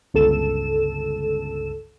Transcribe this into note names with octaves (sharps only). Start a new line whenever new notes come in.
G1 C#2 A4 E7